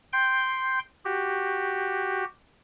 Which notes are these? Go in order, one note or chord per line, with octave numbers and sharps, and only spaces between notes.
G5 C6 G6
F#4 G4